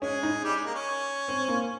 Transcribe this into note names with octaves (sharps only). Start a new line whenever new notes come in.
G#3 C#4 G#4
D#4
G3 G4
G#3
A#3
C#4
C4
A#3